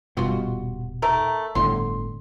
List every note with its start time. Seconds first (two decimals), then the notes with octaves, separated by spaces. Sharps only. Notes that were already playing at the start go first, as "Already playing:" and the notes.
0.17 D#1 G2 B2 F4 F#4
1.02 A3 D#4 A#4
1.55 G1 A2 D3 C6